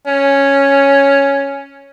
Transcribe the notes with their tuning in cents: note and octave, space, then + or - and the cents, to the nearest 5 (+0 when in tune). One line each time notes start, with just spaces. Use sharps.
C#4 +0